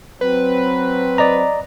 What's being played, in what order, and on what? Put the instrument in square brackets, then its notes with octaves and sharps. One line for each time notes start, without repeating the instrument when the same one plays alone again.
[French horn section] F#3 C4 [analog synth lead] B4
[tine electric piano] D5 D#5 A#5